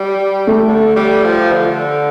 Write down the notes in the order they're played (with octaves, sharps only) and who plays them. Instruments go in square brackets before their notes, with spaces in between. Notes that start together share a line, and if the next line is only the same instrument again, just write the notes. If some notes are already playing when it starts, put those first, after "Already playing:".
Already playing: [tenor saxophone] G3
[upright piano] A3
[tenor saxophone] D3
G3
F3
D3